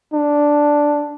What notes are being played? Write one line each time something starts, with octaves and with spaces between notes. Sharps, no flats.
D4